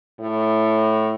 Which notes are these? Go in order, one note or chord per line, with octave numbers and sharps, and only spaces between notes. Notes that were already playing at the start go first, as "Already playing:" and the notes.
A2